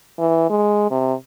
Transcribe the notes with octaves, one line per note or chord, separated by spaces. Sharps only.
E3
G#3
C3